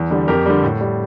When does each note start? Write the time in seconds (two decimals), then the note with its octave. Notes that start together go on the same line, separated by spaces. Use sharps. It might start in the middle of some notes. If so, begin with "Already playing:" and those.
Already playing: E2
0.11 D3 G3
0.28 F2 G4 A#4
0.46 D3 G3
0.63 A2
0.81 G3